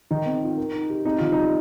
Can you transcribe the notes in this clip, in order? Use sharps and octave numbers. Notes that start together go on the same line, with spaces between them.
D#3 D#4
C4
F4
A#4
D#4
G4
C4 D#4
D#3 F4
D#4
G3